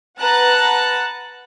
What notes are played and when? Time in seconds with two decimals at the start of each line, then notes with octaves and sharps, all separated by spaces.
0.20 B4 F#5 A5 A#5 F#6